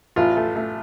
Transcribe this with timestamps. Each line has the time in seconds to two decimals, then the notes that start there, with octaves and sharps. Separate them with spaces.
0.16 A1 F4
0.37 A3
0.56 A3